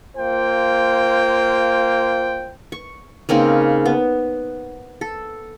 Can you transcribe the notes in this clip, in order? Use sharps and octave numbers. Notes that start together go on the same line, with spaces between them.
A#3 F4 C5 G5
C#6
C#3 A#3 C4 D#4
B3
A4